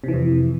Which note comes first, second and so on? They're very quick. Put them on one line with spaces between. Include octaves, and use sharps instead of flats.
C3 E3 F2